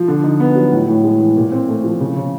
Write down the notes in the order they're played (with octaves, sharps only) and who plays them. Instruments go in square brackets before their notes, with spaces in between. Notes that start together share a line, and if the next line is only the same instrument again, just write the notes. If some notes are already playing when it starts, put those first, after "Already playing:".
Already playing: [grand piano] F3
D3
D#4
B3
F#3
A2
A2
G#3
E3
A#2
C4
A3
F3
C#3
C#3